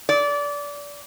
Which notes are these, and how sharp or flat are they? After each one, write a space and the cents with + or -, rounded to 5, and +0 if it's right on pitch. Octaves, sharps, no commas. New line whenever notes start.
D5 -25